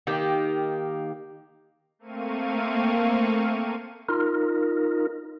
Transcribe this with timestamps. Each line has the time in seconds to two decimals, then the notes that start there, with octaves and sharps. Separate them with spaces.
0.07 D#3 A#3 G4
1.99 A3 A#3 C4 F5 C#6 D#7
4.08 D#4 F4 A#4